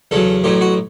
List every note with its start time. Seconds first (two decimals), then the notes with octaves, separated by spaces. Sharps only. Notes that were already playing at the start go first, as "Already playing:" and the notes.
0.11 E2 C#3 F#3 A4
0.44 A1 A2 F#3 G4
0.61 F#4